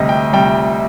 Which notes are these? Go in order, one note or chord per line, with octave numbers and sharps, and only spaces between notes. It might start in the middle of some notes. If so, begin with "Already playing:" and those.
Already playing: D2 C3 G3 D#5
G5
C3 G3 G5